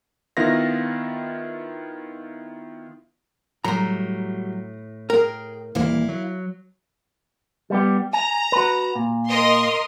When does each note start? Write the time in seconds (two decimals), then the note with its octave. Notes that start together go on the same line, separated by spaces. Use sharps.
0.37 D#3 B3 E4 F4 F5 A#6
3.64 A2 F#3 G3 A#5
5.10 G#4 A#4 G5
5.75 D#1 E3 A#3 E4 F5
6.09 F#3
7.70 G3 B3 G4
8.13 G#5 A#5
8.52 F#4 B4
8.95 A#2
9.28 A#4 D#5 C6